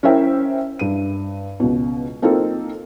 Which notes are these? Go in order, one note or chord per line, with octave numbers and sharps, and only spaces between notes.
C#4 E4 A#4 C5 E5 G5
G2 D#7
C#2 B2
A#3 C4 D#4 F4 A4